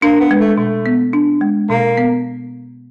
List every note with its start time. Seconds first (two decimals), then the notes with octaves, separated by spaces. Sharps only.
0.02 A#3 D4
0.20 B3
0.31 G#3
0.40 A3
0.58 B2 A3
0.86 B3
1.13 D4
1.41 G#3
1.70 B2 A#3
1.97 B3